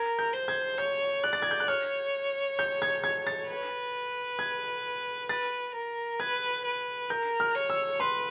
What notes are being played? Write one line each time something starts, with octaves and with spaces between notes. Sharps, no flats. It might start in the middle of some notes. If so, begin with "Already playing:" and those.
Already playing: A#4 G#6
G6
C5
G#6
C#5 G6
D5 F#6
A6
G#6
G6
F#6
C#5 F6
G6
G#6
G#6
A6
B4
G#6
B4 A6
A#4
B4 G#6
B4
A#4 G6
F6
C#5
E6
B4 C6